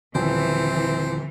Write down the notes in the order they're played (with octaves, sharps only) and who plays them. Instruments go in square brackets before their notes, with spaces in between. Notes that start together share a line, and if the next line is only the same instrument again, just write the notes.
[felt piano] D#1 [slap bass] D3 F3 [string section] E3 [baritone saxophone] C4